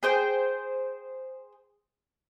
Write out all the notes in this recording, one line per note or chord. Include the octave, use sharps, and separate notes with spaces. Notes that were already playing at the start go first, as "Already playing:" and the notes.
G#4 C5 G5